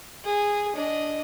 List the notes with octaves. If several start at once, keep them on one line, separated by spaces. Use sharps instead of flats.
G#4
D4 D#5